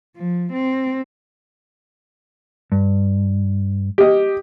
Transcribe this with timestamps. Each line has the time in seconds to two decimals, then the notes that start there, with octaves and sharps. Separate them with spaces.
0.16 F3
0.53 C4
2.72 G2
3.98 G4 D#5